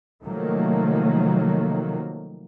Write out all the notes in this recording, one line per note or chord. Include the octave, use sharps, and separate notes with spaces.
C3 D#3 F3 F#3 A3 A#3